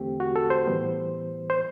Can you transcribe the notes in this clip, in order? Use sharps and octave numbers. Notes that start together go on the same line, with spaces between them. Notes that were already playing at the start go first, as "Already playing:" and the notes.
Already playing: E2 D3 A3 C4 G4
F#4
A4
C5
A2 E3 G3 B3
C5